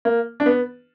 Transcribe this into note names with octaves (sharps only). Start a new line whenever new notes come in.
A#3
D4
B3